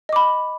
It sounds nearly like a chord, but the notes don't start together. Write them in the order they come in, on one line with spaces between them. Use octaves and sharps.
D#5 D6 B5